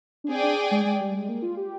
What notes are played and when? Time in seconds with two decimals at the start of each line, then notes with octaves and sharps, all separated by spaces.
0.24 D4
0.28 C4 G#4 D5 G5
0.43 D4
0.71 G#3
0.85 G#3
1.00 G3
1.14 G#3
1.28 A#3
1.42 F4
1.57 G4